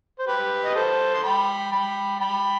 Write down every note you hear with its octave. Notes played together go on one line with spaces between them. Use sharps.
C5
G4 B4
D#5
A4 C5
C6
G5 B5
G5 B5
G5 B5